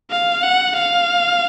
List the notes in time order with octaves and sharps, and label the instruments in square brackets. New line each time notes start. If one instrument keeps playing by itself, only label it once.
[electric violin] F5
F#5
F5